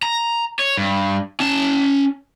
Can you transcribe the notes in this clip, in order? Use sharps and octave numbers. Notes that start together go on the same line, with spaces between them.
A#5
C#5
G2
C#4 A5